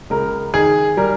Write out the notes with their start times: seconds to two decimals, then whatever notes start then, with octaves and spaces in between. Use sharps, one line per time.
0.10 C#2 A#4
0.53 D#3 G#4
0.97 G3 A#4